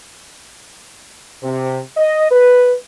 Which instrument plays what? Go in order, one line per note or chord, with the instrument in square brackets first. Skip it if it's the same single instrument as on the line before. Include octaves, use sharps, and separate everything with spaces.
[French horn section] C3
D#5
B4